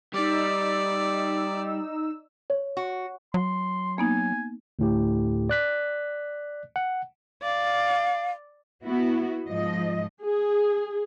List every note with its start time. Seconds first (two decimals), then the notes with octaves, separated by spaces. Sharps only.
0.14 G3 D#4 D5 E6
2.50 C#5
2.77 F#4
3.34 F#3 C6
3.98 A#3 B3 D#4 G#5
4.79 D2 A2 G4
5.49 D5 F#6 B6
6.76 F#5
7.42 D5 F5
8.86 B3 E4 F#4
9.47 G#2 F3 D#5
10.24 G#4